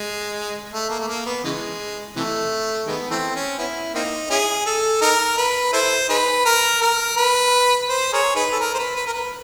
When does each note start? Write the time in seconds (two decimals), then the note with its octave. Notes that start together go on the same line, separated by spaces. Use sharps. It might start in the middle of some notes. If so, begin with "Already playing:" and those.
Already playing: G#3
0.72 A3
0.89 A#3
1.00 A3
1.08 A#3
1.26 B3
1.44 C#3 E3 G#3
2.16 C3 E3 A3
2.87 D#3 G#3 B3
3.10 E3 A3 C4
3.35 C#4
3.58 B3 C#4 E4
3.95 A#3 C4 D#4
4.30 C#4 E4 G#4
4.66 A4
5.01 D#4 A#4
5.37 B4
5.73 E4 A4 C5
6.09 D#4 G#4 B4
6.45 A#4
6.81 A#4
7.17 B4
7.89 C5
8.13 G#4 A#4 C#5
8.36 D#4 G#4 B4
8.52 A4
8.60 A#4
8.74 C5
8.78 B4
8.95 B4
9.06 A#4
9.13 B4